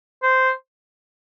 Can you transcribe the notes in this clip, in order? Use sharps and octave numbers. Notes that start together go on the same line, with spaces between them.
C5